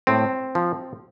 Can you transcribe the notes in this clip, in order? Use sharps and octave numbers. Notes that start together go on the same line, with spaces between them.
A2 C4
F3